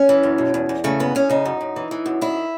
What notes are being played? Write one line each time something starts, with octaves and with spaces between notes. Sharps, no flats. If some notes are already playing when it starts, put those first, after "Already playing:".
Already playing: C#4
E3
F#2
B2
E2
E2
C#3 A3
F#2 B3
F#2 C#4
C#3 D#4
F#2
F#2
E3
E3
F#2
D#3 E4